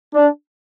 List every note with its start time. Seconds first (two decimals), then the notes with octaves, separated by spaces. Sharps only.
0.13 D4